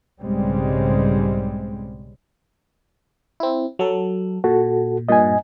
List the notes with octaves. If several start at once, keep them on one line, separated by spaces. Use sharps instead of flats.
B1 G#2 C#3 G3 G#3 C4
C4 E4
F#3 A4
A#2 F#4 A4
G2 A#2 D#5 G#5